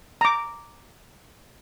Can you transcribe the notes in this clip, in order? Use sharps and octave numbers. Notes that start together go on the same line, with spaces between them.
A#5 D6